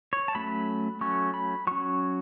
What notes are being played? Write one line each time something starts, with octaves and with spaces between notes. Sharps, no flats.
C#5
A5
F#3 A3 C#4 B5
F#3 A3 C#4 C#6
B5
F#3 C#4 C#6